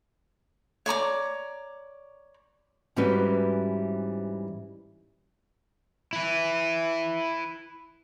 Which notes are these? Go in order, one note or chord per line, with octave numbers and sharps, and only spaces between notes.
C#5 D5 A#5 D6
G#2 E3 G3 C#4 F#4 B4
E4 B4